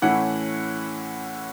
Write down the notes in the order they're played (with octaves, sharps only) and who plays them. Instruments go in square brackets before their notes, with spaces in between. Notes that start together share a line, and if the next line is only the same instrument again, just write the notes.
[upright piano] A2 E3 A3 C#4 E4 F#5